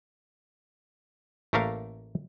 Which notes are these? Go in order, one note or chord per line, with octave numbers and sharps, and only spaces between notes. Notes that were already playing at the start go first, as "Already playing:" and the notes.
A1 A3 A#3 A#4 F5